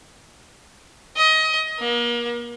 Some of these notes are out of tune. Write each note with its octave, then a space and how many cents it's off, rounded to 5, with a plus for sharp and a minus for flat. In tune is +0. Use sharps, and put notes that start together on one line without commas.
D#5 +25
A#3 +35